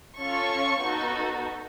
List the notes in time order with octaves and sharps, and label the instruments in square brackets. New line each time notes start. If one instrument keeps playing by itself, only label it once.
[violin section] C#4 F4 A4 C#6
B3 D#4 F#4 A4